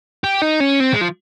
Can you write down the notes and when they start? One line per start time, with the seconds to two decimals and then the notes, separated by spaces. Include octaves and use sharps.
0.24 G4
0.42 D#4
0.60 C#4
0.80 C4
0.93 G#3
1.01 F3